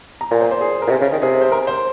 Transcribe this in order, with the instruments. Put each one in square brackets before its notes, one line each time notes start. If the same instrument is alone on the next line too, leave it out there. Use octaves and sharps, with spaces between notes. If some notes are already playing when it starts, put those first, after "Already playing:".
[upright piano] A#5
[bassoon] A#2 [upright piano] G#5
[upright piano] C5
C5
G#4
A#4
[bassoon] A#2
[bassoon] C3 [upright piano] G#4
[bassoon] C#3
D#3
[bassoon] C3 [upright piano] G#4
[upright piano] C5
A#4
C5